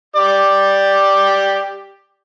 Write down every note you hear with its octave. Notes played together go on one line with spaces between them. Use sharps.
G4 D5